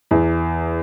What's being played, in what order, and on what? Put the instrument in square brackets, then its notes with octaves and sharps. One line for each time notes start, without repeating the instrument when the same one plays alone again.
[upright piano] E2